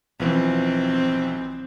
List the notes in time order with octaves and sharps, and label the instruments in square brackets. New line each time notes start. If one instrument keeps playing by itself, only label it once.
[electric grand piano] B1 E3 F3 [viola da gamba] C4